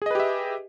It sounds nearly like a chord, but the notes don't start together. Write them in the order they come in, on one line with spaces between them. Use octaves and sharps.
G#4 D#5 B4 G4 E5